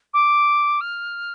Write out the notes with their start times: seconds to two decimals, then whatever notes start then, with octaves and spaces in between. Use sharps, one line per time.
0.14 D6
0.81 F6